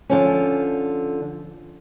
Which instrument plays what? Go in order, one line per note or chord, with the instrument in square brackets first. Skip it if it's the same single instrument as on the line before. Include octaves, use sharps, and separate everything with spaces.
[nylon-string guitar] D3 F3 C#4